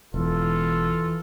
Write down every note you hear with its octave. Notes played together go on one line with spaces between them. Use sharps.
E1 E3 F4 A4